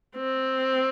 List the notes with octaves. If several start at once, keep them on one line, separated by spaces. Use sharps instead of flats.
C4